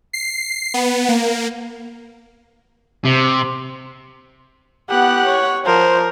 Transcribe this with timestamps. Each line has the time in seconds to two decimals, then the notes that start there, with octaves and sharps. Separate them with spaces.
0.13 C7
0.74 B3
1.09 A#3
3.05 C3
4.90 B3 G4 F#5 F#6
5.25 C#5
5.66 F3 A#4 C5